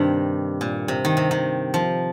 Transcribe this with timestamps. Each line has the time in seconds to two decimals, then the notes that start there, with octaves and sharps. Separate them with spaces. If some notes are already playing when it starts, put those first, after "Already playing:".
Already playing: G2 C3 D#3
0.61 A#2
0.88 C3
1.05 D#3
1.17 C3
1.31 D#3
1.74 F3